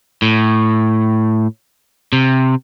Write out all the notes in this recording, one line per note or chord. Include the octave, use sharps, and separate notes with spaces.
A2
C3